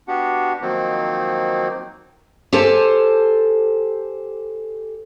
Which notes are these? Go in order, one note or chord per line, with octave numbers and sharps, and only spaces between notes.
B3 D4 F#4 G4 F#5
D#3 F3 F#3 A#3 C4 D#4
G4 A4 C5 G#5 A5